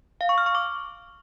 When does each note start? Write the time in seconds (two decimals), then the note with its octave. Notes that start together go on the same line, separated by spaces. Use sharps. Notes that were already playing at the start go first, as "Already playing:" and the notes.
0.21 F5
0.29 C#6
0.38 F6
0.46 C#6
0.55 D6